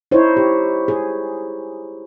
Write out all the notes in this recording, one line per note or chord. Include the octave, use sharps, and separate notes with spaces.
D#4 E4 C5 C#5
G4
G#4